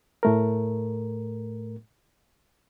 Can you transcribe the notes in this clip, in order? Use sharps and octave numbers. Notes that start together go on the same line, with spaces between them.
A2 A3 A#4